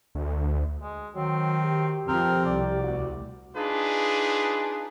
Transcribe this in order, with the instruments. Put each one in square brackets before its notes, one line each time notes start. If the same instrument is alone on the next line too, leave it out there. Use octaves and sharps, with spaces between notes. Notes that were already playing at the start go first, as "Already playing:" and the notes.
[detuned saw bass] D2
[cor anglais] G#3
[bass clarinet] D#3 [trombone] F#3 [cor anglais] C4
[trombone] G4
[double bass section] F2 F3 [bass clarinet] C4 [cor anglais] A#4
[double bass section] C2 [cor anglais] D5
[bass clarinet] D2 [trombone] F#4
[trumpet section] D4 D#4 F4 G#4 B4